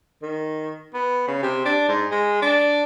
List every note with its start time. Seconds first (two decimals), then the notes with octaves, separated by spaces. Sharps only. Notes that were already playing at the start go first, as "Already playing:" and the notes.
0.22 D#3
0.94 B3
1.28 C#3
1.42 C3
1.65 D4
1.88 G#2
2.11 G#3
2.42 D4